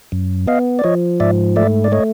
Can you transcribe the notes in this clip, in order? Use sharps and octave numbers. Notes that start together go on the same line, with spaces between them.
F#2
B3 D#5 F5
D5
F3 C#5 D#5
G#2 D5 E5
A3 D5 E5
D5
A3 C#5 D#5